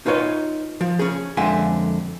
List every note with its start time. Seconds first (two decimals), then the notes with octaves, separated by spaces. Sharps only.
0.06 D#4 F4 B4 C#5 D#5
0.81 F3
0.99 C#4 G#4
1.37 F2 D3 G#3 E5 F#5 G#5